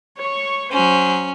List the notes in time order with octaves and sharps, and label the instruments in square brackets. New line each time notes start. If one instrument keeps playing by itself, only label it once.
[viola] C#5 C#6
[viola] F#3 C5 [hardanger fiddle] C#4